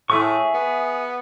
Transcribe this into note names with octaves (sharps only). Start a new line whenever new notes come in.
A2 G#4 E5 C#6
B3